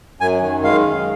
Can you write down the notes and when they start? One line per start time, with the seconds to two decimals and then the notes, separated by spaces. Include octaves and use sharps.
0.20 F#2 G#5
0.41 D#3
0.63 G#3 F5
0.85 F#2